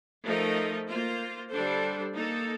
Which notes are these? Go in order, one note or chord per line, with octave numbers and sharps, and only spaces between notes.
F3 A3 D#4 A#4 D#5
A#3 F4 C5
D3 G3 D4 A4 C5
A#3 D#4 A4